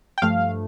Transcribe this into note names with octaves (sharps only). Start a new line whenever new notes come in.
G5
G2 F3 A3 F5